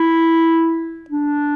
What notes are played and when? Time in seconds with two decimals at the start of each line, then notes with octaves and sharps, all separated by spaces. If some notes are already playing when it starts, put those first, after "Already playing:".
Already playing: E4
1.10 D4